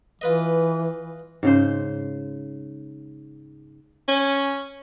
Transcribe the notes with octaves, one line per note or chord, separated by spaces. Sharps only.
E3 F4 B4 D#5
G#2 C#3 C5
C#4